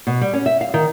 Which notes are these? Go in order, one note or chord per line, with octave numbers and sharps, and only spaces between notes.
B2
G3
C#4
E5
F5
D#3